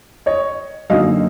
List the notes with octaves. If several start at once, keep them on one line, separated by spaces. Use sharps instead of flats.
C#5 D#5
F#2 D3 F#3 A#3 D#4 D#5 F5